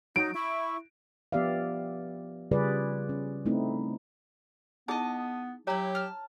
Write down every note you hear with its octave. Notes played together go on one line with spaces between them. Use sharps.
F#3 D#4 D7
E4 C#6
F3 B3 G4 D5 E5 F5
C#3 G3 F4 G#4 B4 D5
C#4
A3 C4 D#4 E4
B3 D#4 E4 G#4 D#5 A5
F#3 E4 G4 C#5 E5 A#5
A5 F6